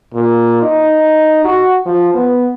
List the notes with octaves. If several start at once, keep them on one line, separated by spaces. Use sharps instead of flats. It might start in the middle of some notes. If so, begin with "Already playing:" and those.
A#2
D#4
F#4
F3
B3